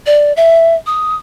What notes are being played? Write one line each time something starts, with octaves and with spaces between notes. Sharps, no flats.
D5
E5
D#6